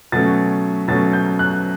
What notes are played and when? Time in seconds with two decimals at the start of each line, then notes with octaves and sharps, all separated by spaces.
0.12 B2 F#3 A3 C#4 A6
0.88 B2 F#3 A3 C#4 A6
1.13 G6
1.39 F#6